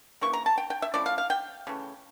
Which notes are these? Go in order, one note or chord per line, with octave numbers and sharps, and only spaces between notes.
C#3 E3 A#3 E4 C#6
A#5
A5
G5
G5
E5
F3 A3 C#4 E4 D5
F5
F5
G5
C#3 E3 A3